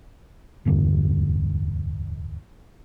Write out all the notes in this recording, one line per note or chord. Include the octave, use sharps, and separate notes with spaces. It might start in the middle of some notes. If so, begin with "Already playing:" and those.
D1 E2 G2 D3